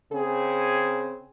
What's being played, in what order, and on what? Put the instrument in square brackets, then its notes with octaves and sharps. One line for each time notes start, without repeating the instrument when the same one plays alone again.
[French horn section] C#3 C4 G#4